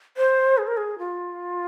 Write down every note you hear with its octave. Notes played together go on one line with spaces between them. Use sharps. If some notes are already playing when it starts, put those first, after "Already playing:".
C5
G#4
A#4
G#4
F4